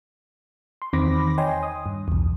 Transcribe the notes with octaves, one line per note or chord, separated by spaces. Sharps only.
C6
E2 D#3 C4 B5 D6 A#6
C#5 D#5 G5 G#5 C6
D#6
G2
B1 E2